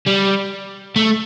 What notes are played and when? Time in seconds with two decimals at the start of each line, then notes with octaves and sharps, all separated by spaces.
0.07 G3
0.96 A3